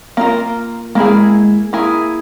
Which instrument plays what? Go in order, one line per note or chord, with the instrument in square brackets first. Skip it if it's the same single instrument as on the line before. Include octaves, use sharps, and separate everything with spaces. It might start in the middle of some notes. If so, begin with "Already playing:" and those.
[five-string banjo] A#3 F4 A#4
[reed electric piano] G#3 [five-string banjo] A#3 E4 G#4
[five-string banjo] A#3 E4 G#4